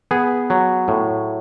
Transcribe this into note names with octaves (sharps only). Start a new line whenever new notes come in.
B3 G#4
F#3
A2